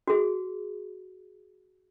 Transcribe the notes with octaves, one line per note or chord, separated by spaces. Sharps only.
F#4 G#4